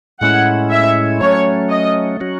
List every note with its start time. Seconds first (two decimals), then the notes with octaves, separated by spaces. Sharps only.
0.21 A2 G#3 C#4 E4 F#5
0.71 E5
1.21 F#3 A3 C#4 C#5
1.70 D#5
2.20 F#3 C#4 F#4